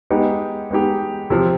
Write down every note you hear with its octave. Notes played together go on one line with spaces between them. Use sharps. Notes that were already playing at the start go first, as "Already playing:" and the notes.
G#3 B3 D#4 G4
G#3 B3 D#4 G4
C3 F3 C4